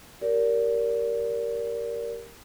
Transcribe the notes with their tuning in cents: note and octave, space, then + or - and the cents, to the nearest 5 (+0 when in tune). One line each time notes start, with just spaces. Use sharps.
G4 +0 A#4 +0 D5 -30